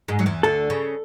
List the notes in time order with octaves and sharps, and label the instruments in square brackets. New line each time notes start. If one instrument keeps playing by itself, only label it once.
[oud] G#2 G#3
F#3
E2 E3
[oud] D2 D3 [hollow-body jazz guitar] A4
[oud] C#3